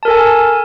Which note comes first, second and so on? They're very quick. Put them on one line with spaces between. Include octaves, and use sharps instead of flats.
A5 A#4 A4 G#5